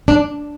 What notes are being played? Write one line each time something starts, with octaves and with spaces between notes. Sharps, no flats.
D4